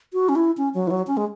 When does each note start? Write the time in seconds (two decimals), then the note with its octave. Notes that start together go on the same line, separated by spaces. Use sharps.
0.13 F#4
0.29 C#4
0.36 E4
0.57 C#4
0.74 F#3
0.87 E3
0.91 F#3
1.07 C#4
1.17 G#3